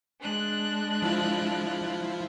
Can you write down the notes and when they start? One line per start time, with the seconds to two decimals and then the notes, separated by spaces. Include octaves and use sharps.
0.22 G#3 D4 F#6
1.02 F3 E4 F4